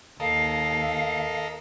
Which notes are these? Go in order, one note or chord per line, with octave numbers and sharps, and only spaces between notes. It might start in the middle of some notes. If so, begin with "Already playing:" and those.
D#2 A4 A#4 D#5 F5